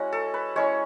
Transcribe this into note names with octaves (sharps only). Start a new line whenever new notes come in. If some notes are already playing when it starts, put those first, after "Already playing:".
Already playing: G#3 C#4 E4 F#4
A4
B4
G#3 C#4 E4 C#5